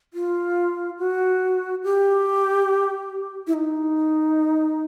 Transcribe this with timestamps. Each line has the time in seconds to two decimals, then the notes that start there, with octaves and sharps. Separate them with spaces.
0.14 F4
0.99 F#4
1.84 G4
3.47 E4
3.54 D#4